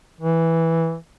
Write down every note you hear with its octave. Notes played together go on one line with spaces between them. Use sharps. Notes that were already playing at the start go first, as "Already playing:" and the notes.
E3